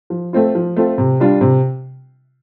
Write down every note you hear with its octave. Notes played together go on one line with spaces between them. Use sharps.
F3
A3 C4 F4
F3
A3 C4 F4
C3
G3 D4 F4
C3